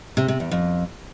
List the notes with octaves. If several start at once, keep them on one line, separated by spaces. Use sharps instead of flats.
C3
C3
E2
F2